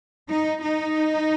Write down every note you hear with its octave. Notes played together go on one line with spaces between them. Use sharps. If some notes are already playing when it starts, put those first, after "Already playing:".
D#4
D#4